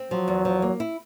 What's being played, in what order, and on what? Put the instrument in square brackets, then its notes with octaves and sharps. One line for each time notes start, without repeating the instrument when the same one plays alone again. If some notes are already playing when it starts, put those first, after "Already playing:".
Already playing: [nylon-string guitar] C4
[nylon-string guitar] F3 [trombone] F#3
[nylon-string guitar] E2
F3
A#3
E4